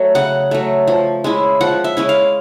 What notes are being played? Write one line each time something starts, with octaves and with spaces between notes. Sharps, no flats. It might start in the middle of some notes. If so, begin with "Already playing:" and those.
Already playing: F#3 A3
C#3 F#5
F#3 A3
F3
G#3 C#4 E4
F3 F#5
E5
G#3 C#4 E4
F5